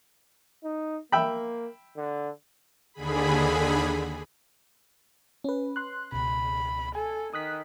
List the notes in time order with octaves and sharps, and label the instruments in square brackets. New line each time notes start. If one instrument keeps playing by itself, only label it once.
[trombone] D#4
[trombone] A#3 [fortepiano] E5 G5 B5
[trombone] D3
[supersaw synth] D#2 D3 G#4 B5
[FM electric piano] C#4 B4
C6 F#6
[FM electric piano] C#2 B2 [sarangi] B5
[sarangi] A4 [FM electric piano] G#5
[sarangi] D#3 [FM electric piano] D#6 F#6 B6